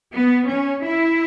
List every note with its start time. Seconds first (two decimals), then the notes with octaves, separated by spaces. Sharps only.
0.13 B3
0.49 C#4
0.84 E4